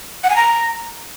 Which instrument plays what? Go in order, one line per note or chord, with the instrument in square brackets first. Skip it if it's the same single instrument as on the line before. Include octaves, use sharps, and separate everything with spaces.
[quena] F#5
G#5
A#5